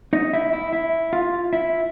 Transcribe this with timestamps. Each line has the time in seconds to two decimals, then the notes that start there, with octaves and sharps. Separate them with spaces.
0.13 D#4 D#5
0.33 E4 E5
0.53 E4 E5
0.72 E4 E5
1.13 F4 F5
1.53 E4 E5